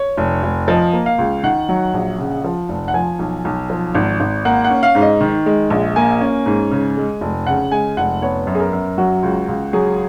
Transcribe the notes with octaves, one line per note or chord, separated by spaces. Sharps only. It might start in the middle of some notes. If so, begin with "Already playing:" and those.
Already playing: C#5
F1
F1
F3 D#5
A#3
F5
C#2
D#3 F#5
F#3
A#1
C#3
F3
F1
F#5
F3 G#5
B1
B1
F3
G#1
G#1
A#3 F#5
F#5
C#4
F5
G#2
D#5
D#3
G#3
A#1
A#3 G#5
C#4
G#2
C#3
G#3
F1
C#3 F#5
G#3 G#5
F1 F#5
B3 C#5
F#2
G#4
A#4
F#2
F#3 F#4
C#2
C#2
F#3 G#4